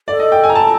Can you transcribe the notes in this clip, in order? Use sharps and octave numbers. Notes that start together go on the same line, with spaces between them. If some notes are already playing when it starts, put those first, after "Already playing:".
A4 D5
D#5
G5
G#5
A#5
A5